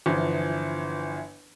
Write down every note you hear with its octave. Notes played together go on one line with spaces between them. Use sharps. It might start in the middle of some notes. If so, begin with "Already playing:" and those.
G1 E3 F3